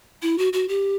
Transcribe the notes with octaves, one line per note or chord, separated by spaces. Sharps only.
E4
F#4
F#4
G4